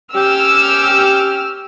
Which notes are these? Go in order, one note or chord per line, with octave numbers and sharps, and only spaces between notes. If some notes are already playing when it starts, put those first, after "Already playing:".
C#4 G4 E6 F6